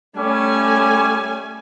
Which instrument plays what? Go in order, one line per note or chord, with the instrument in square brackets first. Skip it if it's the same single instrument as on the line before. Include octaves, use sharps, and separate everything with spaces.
[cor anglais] G3 [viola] A3 G#5 [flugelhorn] C#4